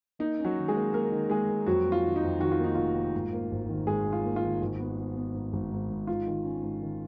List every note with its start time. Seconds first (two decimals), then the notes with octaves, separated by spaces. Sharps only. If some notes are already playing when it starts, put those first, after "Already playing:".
0.19 A#3 D#4
0.39 C#4
0.44 F#3 F#4
0.57 D#3
0.68 G#3 G#4
0.75 A#3
0.93 A#3 A#4
1.12 D#3
1.30 G#3 A#3 G#4
1.48 A#3
1.66 F2 F#3 F#4
1.85 A#3
1.92 F4
2.04 D#3
2.16 D#4
2.22 F2
2.40 D#3 F#4
2.52 F4
2.59 A#3
2.64 D#4
2.75 F1 F4
2.95 A#3
3.14 G#2
3.33 A#3
3.51 G#1
3.68 D#3
3.87 G#1 G#3 G#4
4.06 D#3
4.13 F4
4.25 A#3
4.36 F4
4.43 D#3
4.62 G#1
4.80 B3
4.97 B3
5.16 B3
5.34 G#2
5.53 G#1
5.71 G#2
5.90 G#2
6.07 G#2 F4
6.26 D#3
6.44 C#4
6.63 G#2
6.82 D#3